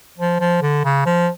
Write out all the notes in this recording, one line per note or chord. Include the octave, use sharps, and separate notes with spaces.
F3
F3
D3
C#3
F3